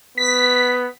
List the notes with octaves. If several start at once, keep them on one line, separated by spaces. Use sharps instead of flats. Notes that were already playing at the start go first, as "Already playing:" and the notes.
B3 B6